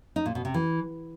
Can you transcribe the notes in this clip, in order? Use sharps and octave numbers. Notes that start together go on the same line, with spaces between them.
D#4
A#2
B2
C3
E3